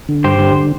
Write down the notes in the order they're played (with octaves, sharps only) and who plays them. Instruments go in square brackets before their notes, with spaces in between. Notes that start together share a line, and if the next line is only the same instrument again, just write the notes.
[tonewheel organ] D3
[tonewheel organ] G2 [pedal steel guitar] G4 C5
[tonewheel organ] D3